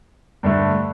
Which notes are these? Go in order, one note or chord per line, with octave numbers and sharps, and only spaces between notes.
G2 D3 A3